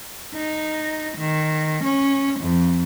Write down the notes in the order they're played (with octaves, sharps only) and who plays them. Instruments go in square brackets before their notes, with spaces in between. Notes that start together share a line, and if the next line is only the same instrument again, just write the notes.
[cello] D#4
D#3
C#4
F2